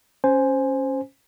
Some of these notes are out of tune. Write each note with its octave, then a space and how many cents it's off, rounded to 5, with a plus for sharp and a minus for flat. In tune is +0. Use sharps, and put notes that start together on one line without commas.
C#4 -10 C5 +0 G#5 +0